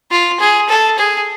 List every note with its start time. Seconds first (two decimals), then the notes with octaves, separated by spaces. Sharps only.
0.11 F4
0.39 G#4
0.69 A4
0.98 G#4